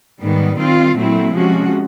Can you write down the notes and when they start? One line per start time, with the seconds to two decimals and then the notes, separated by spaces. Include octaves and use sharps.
0.19 G#2 D#3 G3 B3
0.57 D#3 G3 C4 F4
0.95 A#2 F#3 A3 C4 E4
1.33 C3 F3 G#3 C#4 F#4